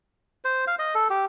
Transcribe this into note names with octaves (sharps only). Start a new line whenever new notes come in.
C5
F5
D#5
A4
G4